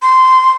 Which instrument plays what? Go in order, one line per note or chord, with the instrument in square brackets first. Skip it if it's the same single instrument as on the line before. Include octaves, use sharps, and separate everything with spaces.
[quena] C6